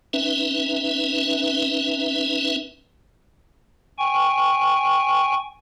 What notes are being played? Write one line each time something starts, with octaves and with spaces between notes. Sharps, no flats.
C4 C#4 D#4 B4 E5
G5 G#5 C#6